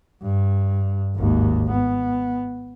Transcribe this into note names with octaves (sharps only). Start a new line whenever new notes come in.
G2
G#1 D#2
B3